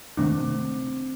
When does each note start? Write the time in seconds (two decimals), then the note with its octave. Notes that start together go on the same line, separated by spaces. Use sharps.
0.17 C3 D#3 A3 C4 D4